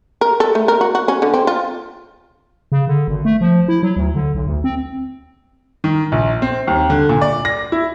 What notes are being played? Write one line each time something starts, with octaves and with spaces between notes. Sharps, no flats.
A#4
A4
A3
A#4
F#4
F#4
C#4
D3
C4
F4
C#3
D3
G#1
A3
F3
E4
F#3
D2
D3
B1
D2
C4
D#3
A#1
C4
D#2
D3
A#2
D5
A#6
E4